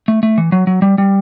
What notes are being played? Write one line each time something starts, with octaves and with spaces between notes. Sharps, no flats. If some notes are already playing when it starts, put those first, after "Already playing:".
A3
A3
E3
F#3
F#3
G3
G3